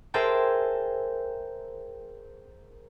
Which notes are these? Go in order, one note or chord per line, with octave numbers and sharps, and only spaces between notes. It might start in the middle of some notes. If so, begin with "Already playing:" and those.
G#4 A#4 C5 E5 G5 A5